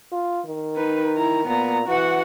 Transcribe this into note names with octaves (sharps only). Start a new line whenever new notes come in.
F4
D#3
D#4 B4
E4 A#5
A#2 B3 A#5
E3 F#4 F#5